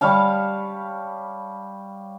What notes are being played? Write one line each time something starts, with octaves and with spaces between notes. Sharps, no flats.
G3 C#5 F5 A5